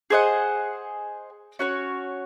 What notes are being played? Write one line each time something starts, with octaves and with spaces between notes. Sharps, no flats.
G#4 C5 D#5 F#5
C#4 F#4 C#5